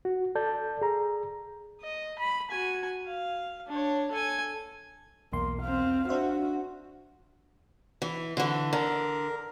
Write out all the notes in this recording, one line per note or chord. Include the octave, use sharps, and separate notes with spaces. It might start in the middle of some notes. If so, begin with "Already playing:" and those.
F#4
A4 D5 A5 G6
G#4 A#5
D#5
B5
F#4 G#5
F5
D4 C#5
A4 G#5
B1 E2 A#3 C6
C4 F5
D4 F#4 C5 E5
E3
D3 E3
D3 A#4